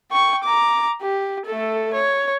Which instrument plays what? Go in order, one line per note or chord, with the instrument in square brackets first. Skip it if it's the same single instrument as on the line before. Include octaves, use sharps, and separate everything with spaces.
[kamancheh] G5 C#6
A#5 D6
G4
A3 A4
C#5